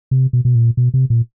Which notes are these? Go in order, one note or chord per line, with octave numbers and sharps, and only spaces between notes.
C3
B2
B2
A#2
B2
C3
A#2